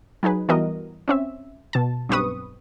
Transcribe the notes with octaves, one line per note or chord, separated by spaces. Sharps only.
F#3 D#4 G#4 B4
E3 G3 B3 F#4 A#4 D#5
C4 C#4 E5
B2 A5
B1 G2 C4 B4 C#6 D#6